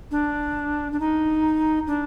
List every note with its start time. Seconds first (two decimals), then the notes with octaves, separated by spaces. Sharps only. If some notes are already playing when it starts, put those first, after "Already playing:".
0.11 D4
0.92 D4
1.00 D#4
1.87 D4